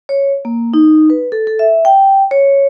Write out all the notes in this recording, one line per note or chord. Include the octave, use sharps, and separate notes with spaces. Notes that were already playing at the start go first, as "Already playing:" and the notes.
C#5
A#3
D#4
B4
A4
A4
E5
G5
C#5